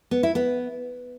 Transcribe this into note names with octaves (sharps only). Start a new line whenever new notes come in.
B3
E4
B3